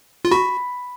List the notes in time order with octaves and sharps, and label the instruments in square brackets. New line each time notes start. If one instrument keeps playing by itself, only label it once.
[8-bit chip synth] F4
[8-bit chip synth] F#4 [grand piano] B5